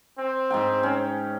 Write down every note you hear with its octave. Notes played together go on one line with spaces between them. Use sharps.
C4
G#2 D#4 G5
C#4